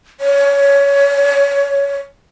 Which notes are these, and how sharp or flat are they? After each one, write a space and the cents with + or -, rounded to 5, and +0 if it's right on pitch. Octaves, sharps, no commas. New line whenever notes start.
C#5 +20